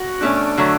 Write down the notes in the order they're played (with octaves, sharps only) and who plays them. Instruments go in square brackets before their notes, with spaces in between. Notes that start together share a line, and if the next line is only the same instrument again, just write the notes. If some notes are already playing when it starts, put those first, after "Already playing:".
Already playing: [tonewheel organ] F#4
[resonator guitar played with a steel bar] B2 A3 C#4 [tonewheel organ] D4
[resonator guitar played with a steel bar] D3 F#3 A3